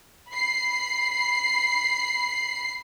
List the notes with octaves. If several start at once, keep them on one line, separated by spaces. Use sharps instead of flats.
B5 C7